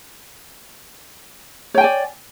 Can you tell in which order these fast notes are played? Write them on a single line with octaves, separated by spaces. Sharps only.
C#5 G5 G#5 D5